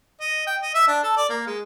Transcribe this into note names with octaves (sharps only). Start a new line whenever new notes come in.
D#5
G5
D#5
E5
D4
A4
D5
A#3
G#3